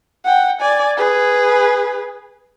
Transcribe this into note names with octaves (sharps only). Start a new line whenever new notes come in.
F#5 G5
D5 G#5
G#4 B4